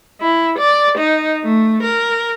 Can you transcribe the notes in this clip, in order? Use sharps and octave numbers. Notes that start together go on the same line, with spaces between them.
E4
D5
D#4
A3
A#4